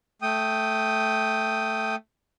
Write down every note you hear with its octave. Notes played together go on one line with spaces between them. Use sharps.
A3 G5 D#6